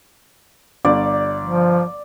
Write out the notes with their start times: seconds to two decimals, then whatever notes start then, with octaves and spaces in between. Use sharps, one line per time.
0.85 G1 D5
1.45 F3